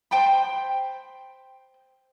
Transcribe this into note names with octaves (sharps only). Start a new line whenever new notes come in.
C5 G5 A5 B5